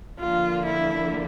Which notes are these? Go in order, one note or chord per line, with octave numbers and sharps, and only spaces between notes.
D3 F3 A#3 F4
E4